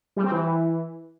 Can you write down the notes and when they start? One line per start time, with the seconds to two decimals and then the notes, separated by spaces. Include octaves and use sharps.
0.16 G3
0.24 C4
0.31 E3